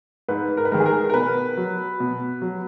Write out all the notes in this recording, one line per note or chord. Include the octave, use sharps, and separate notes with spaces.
G#2 B4
A#4
B4
D#3 G#3 A#4
G#4
A#4
A#4
B2 B4
F#3
B2
F#3